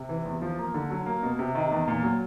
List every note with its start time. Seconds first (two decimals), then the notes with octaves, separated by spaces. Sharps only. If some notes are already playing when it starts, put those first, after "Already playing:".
Already playing: C3
0.09 E3
0.25 E2
0.42 F3
0.58 A#3
0.74 D3
0.90 F#3
1.06 A#3
1.23 B2
1.39 C3
1.55 D#3
1.72 E2
1.87 A#2
2.03 F#3